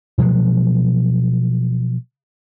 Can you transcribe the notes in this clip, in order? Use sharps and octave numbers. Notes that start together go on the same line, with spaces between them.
B2 F3 F#3 G#3